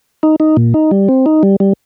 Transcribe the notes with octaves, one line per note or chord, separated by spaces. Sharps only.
D#4
D#4
A#2
D#4
G3
C4
D#4
G3
G3